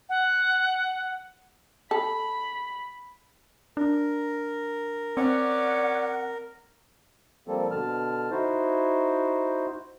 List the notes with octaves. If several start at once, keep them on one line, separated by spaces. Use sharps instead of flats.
F#5
A4 B5
D4 A#4
C4 C#4 D5 F#5
F3 G3 A#3 C4 A4
B2 D3 A5 F6
D#4 E4 F#4 C5